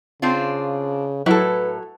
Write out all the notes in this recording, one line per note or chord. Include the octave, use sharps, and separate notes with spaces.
C#3 C4 D4 F4
A2 F#3 E4 A4 B4